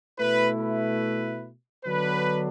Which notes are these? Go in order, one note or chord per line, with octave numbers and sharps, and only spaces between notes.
B2 A3 E4 B4
B4
D3 F#3 B3 D4 B4